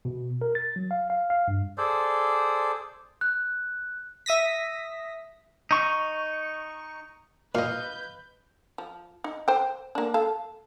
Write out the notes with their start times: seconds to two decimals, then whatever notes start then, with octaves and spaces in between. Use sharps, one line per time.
0.05 B2
0.41 A#4
0.55 A6
0.76 F#3
0.91 F5
1.10 F5
1.30 F5
1.48 G2
1.78 G#4 A4 C5 D5
3.21 F#6
4.26 E5 D#6 A#6 B6
5.71 D#4 C#6
7.55 A#2 B4 D#5 F5 G6
8.78 F3
9.24 D#4
9.48 C5 G5
9.95 A#3 D4
10.14 A4 F5